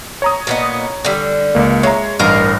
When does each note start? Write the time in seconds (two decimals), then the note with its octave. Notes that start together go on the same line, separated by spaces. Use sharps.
0.22 C#5 A#5 D#6
0.47 A#2 B3 D#5
1.05 D3 G3
1.55 C#2 A#3
1.83 G#3 C#5 E5 A#5
2.19 A1 G2 A#4 D#5 F5